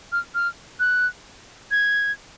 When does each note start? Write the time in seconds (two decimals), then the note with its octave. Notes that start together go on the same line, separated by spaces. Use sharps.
0.12 F6
0.35 F6
0.80 F#6
1.71 G#6